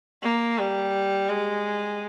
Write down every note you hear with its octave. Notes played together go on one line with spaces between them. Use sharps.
A#3
G3
G#3